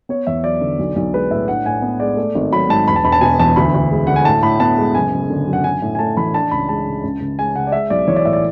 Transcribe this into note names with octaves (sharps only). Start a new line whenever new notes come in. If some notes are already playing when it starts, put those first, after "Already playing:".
B3 C#5
E2 E5
F#3 D5
D3
B1
B1
G#3 B4
A2 E5
D4 F#5
A2 G#5
B3
G#3 D5
A3
G#1
F#3 B5
G#2 A5
E1 B5
A5
E1 B5
A5
B2 G#5
E2 A5
D2 B5
D2
G#3
D3 F#5
G#5
A2 A5
A2 B5
B3 A5
G#3
F#1 G#5
F#1
D3
F#2
F#5
D4 G#5
A2
G#5
A3 A5
E3 B5
D4 A5
C#2 B5
G#3 A5
C#3
C#2
C#2
G#3 G#5
C#3 F#5
D5
G#3 E5
B1 D5
E3 C#5
D5
A2 E5
D5